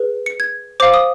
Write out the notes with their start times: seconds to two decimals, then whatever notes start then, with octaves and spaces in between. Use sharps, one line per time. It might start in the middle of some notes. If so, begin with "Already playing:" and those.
Already playing: G#4 B4
0.26 C#7
0.40 G#6
0.80 C5 F5 D6
0.94 D#6